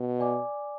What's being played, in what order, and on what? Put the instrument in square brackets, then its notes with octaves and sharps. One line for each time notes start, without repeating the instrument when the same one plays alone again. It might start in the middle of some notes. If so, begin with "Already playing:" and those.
Already playing: [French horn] B2
[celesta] D5 G#5 D6